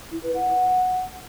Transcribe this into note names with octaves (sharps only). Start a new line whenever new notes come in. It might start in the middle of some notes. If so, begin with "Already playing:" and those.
E4
B4
F#5